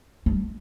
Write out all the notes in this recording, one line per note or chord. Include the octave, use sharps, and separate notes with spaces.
G2